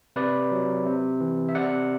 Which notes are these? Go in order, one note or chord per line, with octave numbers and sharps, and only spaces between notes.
C3 B4 D5
F#3
C3
E3
E5
C3 D5 F#5